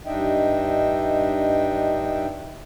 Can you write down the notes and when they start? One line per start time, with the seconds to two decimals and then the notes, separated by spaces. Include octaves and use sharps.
0.06 G2 D4 D#4 D#5 E5 G5